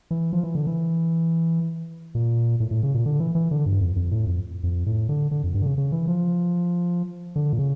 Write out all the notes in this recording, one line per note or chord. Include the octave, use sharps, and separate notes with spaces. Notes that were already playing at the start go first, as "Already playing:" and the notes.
E3
F3
E3
D3
E3
A#2
A2
A2
C#3
A#2
D3
E3
E3
D3
G2
F2
F2
A2
F2
F2
A2
D3
D3
F2
G2
D3
C#3
C#3
E3
F3
D3
A#2
C#3